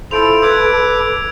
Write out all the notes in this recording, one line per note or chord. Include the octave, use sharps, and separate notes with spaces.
E4 F4 A4 C5 E6 D7 F7
B4 D6 E6 G#6 D7